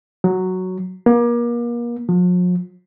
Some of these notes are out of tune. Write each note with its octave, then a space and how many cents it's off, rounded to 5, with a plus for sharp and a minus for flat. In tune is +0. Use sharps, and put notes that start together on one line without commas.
F#3 +0
A#3 +35
F3 +45